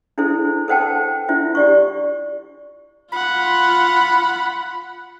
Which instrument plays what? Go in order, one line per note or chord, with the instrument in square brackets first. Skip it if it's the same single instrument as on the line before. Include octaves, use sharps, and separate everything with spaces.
[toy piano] D4 E4 G#4 A4 C5
A4 B4 C5 F#5 G5 A5
D4 E4 F4 C5 E5
G4 D5 C#6
[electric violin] F4 F#5 [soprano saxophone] B5